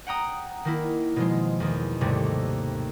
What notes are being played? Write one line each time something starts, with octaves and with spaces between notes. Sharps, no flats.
F#5 G5 A#5 D#6
D#3 A#3 E4
B2 F3 G#3
E2 D#3
D#2 G#2 C3 G3 A3